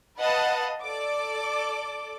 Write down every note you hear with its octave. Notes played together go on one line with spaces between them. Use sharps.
B4 D#5 F5 F#5 A5
A4 D5 D6